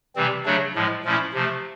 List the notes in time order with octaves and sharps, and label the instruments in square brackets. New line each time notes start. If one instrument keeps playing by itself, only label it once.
[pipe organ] C3 E3 G3 C4
C#3 F#3 A3 D4
A2 F3 G#3
A#2 F3 A3 C#4 E4
C3 F3 A3